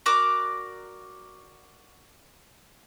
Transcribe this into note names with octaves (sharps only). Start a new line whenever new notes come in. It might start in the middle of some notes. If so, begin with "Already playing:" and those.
F#4 A#4 D5 D6